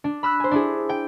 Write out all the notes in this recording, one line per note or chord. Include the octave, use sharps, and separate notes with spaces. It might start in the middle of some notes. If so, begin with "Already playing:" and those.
D4
B5 E6 F#6
C5 G#5
D4 E4 G#4
G5